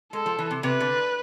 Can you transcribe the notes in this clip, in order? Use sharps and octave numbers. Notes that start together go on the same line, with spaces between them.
G#3 A4
F3
E3
C3
C3 B4
D3